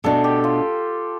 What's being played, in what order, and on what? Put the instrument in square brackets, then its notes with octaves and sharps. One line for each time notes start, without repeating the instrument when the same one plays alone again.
[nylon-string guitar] B2 A3 D4 [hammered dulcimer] A4
[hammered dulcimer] G4
F4